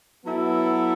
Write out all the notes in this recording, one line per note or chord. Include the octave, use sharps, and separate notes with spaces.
F#3 B3 E4 A4